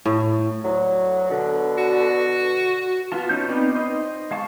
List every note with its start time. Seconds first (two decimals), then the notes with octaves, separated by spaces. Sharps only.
0.05 A2
0.64 D2 F#3
1.30 B2 D3
1.78 F#4
3.12 B3 F4 A5
3.29 C#4 D#4 G6
3.49 B3 C4 D4 D#4
3.75 C5 D#5
4.31 G#3 F5 A5 C#6